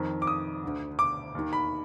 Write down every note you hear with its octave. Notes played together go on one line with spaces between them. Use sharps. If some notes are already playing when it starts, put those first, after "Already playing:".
Already playing: F2 D#3
D6
D#6
D2 D3
D6
D#2 D#3
B5